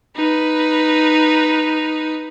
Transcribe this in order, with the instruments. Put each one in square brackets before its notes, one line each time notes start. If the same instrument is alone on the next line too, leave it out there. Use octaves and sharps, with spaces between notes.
[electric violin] D#4 B4